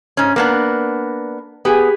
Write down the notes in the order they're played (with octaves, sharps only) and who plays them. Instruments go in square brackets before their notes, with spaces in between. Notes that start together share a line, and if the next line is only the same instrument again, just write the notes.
[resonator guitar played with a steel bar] G#2 C#4
A#3 B3 D4
[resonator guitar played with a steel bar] B3 [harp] G4 G#4 G#5